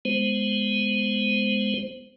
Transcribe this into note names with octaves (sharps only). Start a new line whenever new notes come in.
G#3 B3 C5